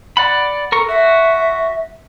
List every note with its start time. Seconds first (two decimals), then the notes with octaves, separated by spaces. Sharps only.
0.17 D5 F#5 B5
0.72 A4 A#4 C#6
0.89 F#4 E5